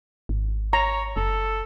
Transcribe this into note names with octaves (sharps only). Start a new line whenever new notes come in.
G#1
C#5 A#5
F#1 A4